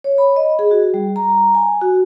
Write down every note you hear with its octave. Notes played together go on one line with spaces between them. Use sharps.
C#5
B5
D#5
G#4
F#4
G3
A#5
G#5
F#4